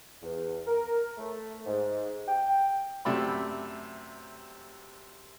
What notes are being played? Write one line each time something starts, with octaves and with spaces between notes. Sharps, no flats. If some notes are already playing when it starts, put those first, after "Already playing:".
E2
A#4
A3
G#2
G5
F#2 C3 A3 D5 G5 B5